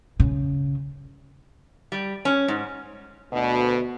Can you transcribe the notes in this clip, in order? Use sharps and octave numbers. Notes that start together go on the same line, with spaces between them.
C#3
G3
C#4
G#2
D2 B2